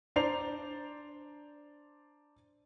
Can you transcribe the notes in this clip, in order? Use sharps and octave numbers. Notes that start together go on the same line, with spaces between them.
D4 C5 D5 A#5 C7 F7